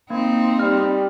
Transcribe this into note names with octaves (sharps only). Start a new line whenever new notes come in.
A#3 C4 D#4
G3 F6